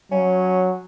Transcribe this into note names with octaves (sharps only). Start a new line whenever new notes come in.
F#3 C#4